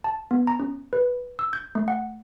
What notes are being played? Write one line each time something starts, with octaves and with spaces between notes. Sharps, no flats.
A5
B3
A#5
C#4
B4
E6
G6
A3
F#5